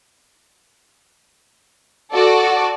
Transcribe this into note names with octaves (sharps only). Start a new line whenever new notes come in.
F#4 A4 D5